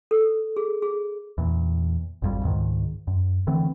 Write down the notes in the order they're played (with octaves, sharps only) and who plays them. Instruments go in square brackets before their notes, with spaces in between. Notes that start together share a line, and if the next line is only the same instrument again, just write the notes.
[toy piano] A4
G#4
G#4
[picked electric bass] E2 A#2
G#1 F2 G3
C#2 G#2 D#3
F#2
D3 E3 A3 C4